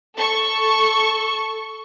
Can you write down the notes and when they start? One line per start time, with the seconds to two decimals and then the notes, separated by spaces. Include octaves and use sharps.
0.17 A4 C#6